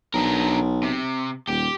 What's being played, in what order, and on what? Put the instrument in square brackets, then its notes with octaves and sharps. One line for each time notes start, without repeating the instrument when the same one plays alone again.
[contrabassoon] B1 [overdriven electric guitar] D4 A#4
[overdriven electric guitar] C3
[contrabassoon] D#1 [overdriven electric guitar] G4